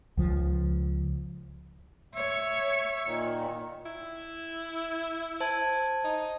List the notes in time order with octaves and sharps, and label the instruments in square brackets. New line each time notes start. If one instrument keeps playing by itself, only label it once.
[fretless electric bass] C#2 F3
[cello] C#5 [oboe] E5
[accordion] A#2 D#3
[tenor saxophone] E4
[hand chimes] C5 A5 G#6
[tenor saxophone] D#4